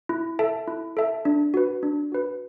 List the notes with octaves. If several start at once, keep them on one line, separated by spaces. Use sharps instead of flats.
E4
A4 E5 A5
E4
A4 E5 A5
D4
F#4 B4
D4
F#4 B4